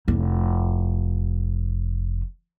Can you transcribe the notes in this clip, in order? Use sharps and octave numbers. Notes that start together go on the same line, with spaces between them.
F1 E4